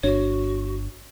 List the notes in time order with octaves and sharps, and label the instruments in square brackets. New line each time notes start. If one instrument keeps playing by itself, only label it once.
[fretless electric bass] G1 D4 [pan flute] F#4 [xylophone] C#5